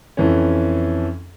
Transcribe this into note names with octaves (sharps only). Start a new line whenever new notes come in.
F2 E3 C#4